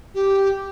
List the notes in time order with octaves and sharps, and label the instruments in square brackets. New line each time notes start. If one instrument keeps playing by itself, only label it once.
[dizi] G4